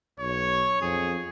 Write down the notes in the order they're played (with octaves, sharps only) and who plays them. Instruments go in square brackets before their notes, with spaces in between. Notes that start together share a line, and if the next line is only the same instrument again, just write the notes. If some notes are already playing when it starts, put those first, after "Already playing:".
[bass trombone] B1 [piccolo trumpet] C#5
[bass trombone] F2 [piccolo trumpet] G#4